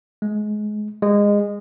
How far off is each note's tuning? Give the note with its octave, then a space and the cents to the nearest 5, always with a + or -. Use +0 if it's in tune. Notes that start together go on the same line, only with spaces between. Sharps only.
G#3 +25
G#3 -20